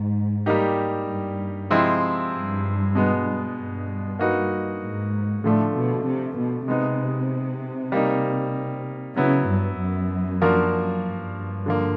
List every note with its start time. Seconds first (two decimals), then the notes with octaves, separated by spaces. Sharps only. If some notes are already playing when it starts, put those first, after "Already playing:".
Already playing: G#2
0.46 G3 A#3 D#4 G4
1.08 G2
1.70 C3 F3 G#3 C4 E4
2.32 G2
2.95 B2 G#3 B3
3.57 G2
4.19 A#3 D#4 F#4 B4
4.81 G#2
5.43 A2 D3 F3 A3 D4
5.75 B2
6.05 C3
6.37 B2
6.68 C3 G#3 B3 D#4
7.92 G3 A#3 D#4
9.16 C#3 F#3 B3 E4
9.48 G2
9.80 F#2
10.41 F3 A#3 D4 F#4 A#4
11.04 G2
11.66 D3 F3 A#3